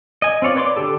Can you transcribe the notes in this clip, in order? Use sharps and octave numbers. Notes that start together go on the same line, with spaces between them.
D#5 G#5
C4 F4 C#5 D5
B4 C#5 D5 C6 D6
D3 G4 A4